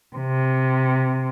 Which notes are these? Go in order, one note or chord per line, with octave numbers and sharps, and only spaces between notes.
C3